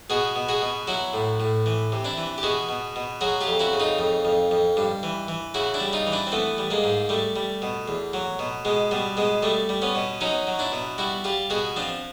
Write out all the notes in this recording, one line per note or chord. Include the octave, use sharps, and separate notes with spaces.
B2 F#4 G#4
B2
F#4 G#4
B2
F#3 E4 F#4
A2
A2
E3
C3
D4 E4
E3
G4
B2 F#4 G#4
B2
B2
F#3 F#4 G#4
F4 G4
F2
E4 F#4
C#3
D#4 F4
F2
F2
F2
G2
E3
E3
C#3 E4 F#4
D4 E4
G3
D#4 F4
E3
D4 E4
C4
E3 A3 B3
G3
G#3 A#3
G#2
G3 A3
G3
B2
E2
F#3
B2
B2 G#3
B2 G3
B2 G#3
G3 A3
G3
B3 C#4
B2
F#3 C#4 D#4
F#3
D4 E4
B2
G3 E4 F#4
G3 F4 G4
B2 F#4 G#4
F3 C4 D4